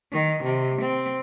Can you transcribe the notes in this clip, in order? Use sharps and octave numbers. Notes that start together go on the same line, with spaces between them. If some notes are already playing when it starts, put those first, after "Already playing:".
D#3
C3
C4